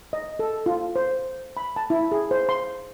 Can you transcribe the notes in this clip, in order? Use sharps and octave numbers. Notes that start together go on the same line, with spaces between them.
D#5
A4
F4
C5
B5
A5
E4
G#4
C5
C6